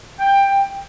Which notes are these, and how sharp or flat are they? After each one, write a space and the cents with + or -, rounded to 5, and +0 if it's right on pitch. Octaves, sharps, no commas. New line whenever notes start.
G5 +15